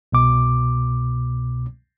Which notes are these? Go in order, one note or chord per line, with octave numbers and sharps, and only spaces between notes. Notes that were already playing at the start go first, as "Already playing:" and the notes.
C2 B2 D6